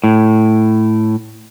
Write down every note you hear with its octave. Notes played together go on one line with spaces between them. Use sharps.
A2